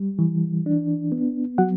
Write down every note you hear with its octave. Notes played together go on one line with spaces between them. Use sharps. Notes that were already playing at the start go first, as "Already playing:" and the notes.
Already playing: G3
E3
D4
B3
F#3 F#4 F#5